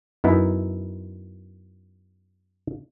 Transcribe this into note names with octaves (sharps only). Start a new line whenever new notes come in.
F#2 B3 D#4 E4